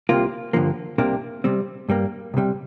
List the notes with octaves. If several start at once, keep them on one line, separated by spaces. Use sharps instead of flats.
C2 C3 A#3 F4
G2 D3 F3 A#3
C2 C3 A#3 D4
C3 G3 C4
G2 G3 A#3
C2 C3 G3